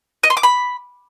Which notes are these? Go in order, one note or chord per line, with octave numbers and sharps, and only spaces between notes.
D#5
C6
D6
B5